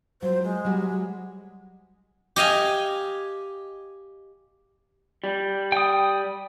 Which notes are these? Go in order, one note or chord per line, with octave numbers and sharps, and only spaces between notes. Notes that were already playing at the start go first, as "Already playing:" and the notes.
F#3 F4 C5
G#3
F#3 G3 F#4
G4 D#5 F5 G#5
G3
G5 D#6